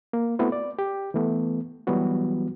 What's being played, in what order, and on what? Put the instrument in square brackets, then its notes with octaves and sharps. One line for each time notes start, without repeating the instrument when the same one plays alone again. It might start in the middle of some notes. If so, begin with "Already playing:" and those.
[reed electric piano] A#3
A3 B3 C4 E4 F#4
D5
G4
E3 A3 B3
E3 F#3 G3 B3 F#4